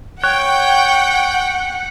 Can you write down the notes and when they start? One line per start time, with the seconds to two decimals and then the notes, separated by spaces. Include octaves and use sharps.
0.23 C#5 F#5 G5 F#6